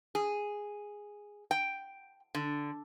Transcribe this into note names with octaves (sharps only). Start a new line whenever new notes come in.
G#4
G5
D3